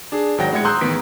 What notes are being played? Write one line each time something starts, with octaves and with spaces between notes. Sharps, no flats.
D4 G#4
G#1 F#3 F#5 G5 A#6
A2 G#3 F#5 G#6 C#7
A#5 C6 D#6 E6 F#6 G6
A1 D#3 B3 B6 D7